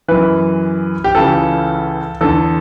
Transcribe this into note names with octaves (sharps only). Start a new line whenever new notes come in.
F#2 E3 B4
G4
C#2 C#3 E3 A4
E2 D3 A4